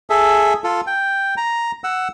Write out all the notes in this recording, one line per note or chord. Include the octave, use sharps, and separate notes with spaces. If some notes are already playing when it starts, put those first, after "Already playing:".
G#4 A4 E5
F4 A4
G5
A#5
F#5 E6